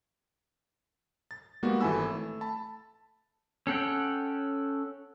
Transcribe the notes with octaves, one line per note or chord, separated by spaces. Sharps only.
A6
G3 G#3 A#3 B3 D#4 F#4
G#1 E3 A4 G#5 B5 E6
A3
A5 B5
C#4 A4 F#5 G5